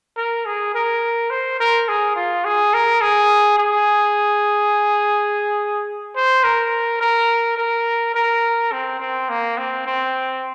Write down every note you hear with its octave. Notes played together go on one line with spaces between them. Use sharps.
A#4
G#4
A#4
C5
A#4
G#4
F4
G#4
A#4
G#4
G#4
C5
A#4
A#4
A#4
A#4
C4
C4
A#3
C4
C4